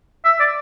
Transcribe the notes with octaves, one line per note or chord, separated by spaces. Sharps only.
E5
D5